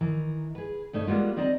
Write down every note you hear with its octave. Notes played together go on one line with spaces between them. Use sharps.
D#3 E3 A#5
G#4 B4
G2 A3 D#4 C#5
G3 G#3 A#3 B3 F4
C4 D#4 D5 D#5 A#5